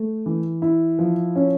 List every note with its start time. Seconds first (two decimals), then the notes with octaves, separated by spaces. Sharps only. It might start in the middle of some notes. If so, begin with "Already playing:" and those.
Already playing: A3
0.26 E3
0.62 E4
0.99 F3
1.36 C#4